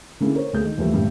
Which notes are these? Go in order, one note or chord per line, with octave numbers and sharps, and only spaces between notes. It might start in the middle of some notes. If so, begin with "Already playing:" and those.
D3 A#3 C#4 E4 G#4
A#4 C5 C#5
D2 A#3 G#4 G6
D#3
D#2 E3 F3 G3 A3
G2 A#2 D3 G3 A3